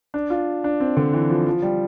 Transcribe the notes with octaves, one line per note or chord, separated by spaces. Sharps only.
D4
F4
D4
C4
D3
E3
F3
F3
G3